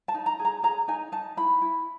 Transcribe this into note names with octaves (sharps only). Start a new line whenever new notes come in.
A5
D#4
A#5
G#4
A#5
G#4 A#5
D#4 G#5
D#4 A5
E4 B5
E4